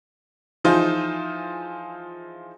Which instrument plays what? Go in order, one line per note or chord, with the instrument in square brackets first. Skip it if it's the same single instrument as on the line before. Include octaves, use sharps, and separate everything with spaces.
[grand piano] E3 F3 D#4 F4 G#4 C5